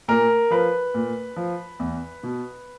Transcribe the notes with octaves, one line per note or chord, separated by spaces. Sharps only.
A#2 A#4
F3 B4
A#2
F3
E2
B2